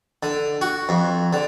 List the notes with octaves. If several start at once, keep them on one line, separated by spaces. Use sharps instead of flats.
D3
F#4
F2
D3